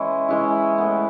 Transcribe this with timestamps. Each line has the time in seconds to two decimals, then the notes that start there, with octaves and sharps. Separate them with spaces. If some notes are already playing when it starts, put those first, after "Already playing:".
Already playing: E3 G#3 C#4 E4
0.28 E3 G#3 C#4 E4
0.78 A2 G#3 B3